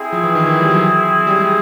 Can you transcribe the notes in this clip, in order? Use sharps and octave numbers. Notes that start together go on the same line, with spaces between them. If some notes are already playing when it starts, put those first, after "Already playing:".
Already playing: C4 E4 G#4
F3
E3
D#3
E3
G3
F#3
G3
G#3